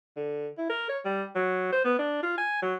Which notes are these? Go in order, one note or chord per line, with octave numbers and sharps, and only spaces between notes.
D3
E4
A#4
C#5
G3
F#3
C5
B3
D4
F4
G#5
F#3